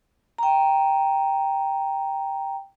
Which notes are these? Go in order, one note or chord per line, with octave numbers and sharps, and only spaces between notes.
G5 A#5